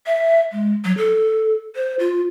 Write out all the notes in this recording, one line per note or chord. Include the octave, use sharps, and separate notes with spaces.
E5
G#3
F#3
A4
C5
F4